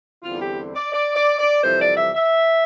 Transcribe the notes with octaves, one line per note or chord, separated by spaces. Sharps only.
E2 D3 G3 C4 F4
G4
D5
D5
D5
D5
F2 C3 E3 G3 C5
D5
E5
E5